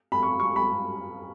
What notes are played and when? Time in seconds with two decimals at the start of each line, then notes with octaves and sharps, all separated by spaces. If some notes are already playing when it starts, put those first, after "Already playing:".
0.12 B5
0.23 C#6
0.40 C#6
0.56 B5